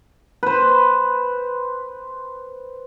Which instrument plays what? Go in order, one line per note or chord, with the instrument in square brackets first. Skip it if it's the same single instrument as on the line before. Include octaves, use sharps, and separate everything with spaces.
[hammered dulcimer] B4 C5